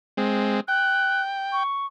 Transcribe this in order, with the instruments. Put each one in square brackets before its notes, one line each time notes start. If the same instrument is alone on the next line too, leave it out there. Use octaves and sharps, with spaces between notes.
[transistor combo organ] G#3 C4
[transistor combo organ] G5 [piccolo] F#6
[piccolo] C#6